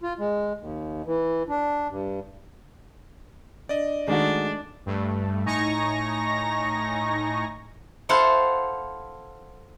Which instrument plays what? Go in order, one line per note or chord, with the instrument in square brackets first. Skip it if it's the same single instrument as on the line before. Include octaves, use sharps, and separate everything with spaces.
[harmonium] F4
G#3
D#2
E3
D4
G2
[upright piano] D4 [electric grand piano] D5 D#5
[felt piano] D#3 F#4 [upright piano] G#3 A3 [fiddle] D4
[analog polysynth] G2 A3
A2 D#4 G#5 A#5 C#6 A#6
[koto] E4 A4 C5 F5 F#5